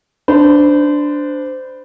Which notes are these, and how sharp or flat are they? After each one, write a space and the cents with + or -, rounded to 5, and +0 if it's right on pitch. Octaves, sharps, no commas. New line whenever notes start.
D4 +0 C5 -25 B5 +0